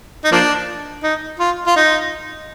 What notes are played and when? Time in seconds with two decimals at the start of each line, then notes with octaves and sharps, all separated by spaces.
0.24 D#4
0.32 F3 A#3 D4
1.03 D#4
1.40 F4
1.67 F4
1.76 D#4